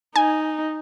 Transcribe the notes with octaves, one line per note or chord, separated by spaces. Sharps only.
D#4 G#5